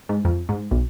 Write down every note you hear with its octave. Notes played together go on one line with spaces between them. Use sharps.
G#2
F2
G#2
B1